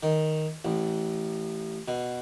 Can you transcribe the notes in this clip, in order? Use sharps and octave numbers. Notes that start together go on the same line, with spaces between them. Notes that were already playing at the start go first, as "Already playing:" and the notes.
D#3
A1
B2